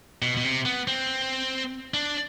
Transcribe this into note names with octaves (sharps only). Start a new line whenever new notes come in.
B2
B2
C3
B3
C4
D4